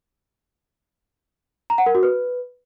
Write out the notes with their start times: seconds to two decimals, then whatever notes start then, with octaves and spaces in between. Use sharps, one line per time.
1.70 A#5
1.78 F#5
1.86 A#4
1.95 F#4
2.03 B4